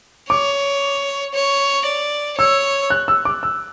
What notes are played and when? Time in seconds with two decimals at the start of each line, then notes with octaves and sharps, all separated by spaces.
0.30 C#5 D6
1.34 C#5
1.86 D5
2.38 C#5 E6
2.90 F#6
3.08 E6
3.25 D6
3.43 E6